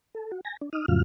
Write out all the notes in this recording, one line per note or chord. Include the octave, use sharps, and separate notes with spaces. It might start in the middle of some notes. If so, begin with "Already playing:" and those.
A4
F#4
G#5 A#6
D4
D#4 D#6 F6
F2 A2 C#3 F#3 F4 F6